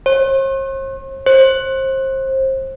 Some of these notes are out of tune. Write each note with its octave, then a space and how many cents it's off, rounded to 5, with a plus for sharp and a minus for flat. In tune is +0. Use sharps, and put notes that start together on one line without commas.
C5 +45
C5 +30